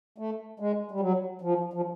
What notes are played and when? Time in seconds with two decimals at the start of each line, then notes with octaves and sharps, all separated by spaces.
0.18 A3
0.60 G#3
0.91 G3
1.00 F#3
1.42 F3
1.73 F3